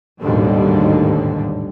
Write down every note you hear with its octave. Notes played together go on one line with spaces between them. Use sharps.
A1 D#2 G#2 B2 D3 G3